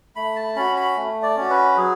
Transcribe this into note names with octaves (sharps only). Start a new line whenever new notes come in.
A3 B5
A5
C#4 F#4 B5
B5
A3
D5
C#4 F#4
B4
F#3 G#4